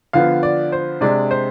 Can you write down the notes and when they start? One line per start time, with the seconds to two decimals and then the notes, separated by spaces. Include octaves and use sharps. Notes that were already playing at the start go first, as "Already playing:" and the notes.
0.13 D3 F3 B3 F5
0.43 D5
0.72 C5
1.01 C3 G#3 D4 D5
1.31 C5